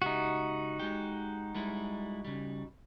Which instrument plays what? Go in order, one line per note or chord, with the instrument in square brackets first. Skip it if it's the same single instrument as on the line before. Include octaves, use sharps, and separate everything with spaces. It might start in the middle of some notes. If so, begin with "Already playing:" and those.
[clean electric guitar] C#2 G4 E5 [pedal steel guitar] D#4 F#4
[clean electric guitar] G#3 G4
G3 G#3 E4
C#3 G3